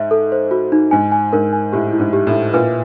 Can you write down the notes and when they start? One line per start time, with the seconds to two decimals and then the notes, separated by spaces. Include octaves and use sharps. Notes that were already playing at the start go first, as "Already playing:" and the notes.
Already playing: G#2 E5
0.11 A4
0.32 C5
0.51 F#4
0.72 D#4
0.91 G#2 G#5
1.12 G#5
1.33 G#2 A#4
1.53 G#5
1.72 A2 G4
1.93 E4
2.00 G#2
2.13 G4
2.27 A2
2.33 E4
2.53 A#2 B4